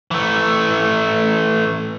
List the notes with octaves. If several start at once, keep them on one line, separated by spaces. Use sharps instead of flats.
E3 A3